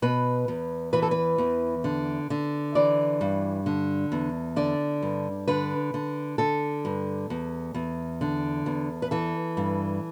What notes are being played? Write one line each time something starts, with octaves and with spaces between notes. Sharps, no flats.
B2 B4
E2
E3 B4
A4
B4
E2
D3
D3
E3 D5
G2
D3
E2
D3 D5
G2
D3 B4
D3
D3 A4
G2
E2
E2
D3
E2
B4
E3 A4
G2